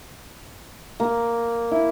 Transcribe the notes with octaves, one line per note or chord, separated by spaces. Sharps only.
A#3
E4